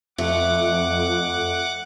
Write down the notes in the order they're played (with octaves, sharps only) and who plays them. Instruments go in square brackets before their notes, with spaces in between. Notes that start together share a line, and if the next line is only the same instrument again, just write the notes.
[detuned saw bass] F2 [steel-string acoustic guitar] A3 [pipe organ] F#5 D6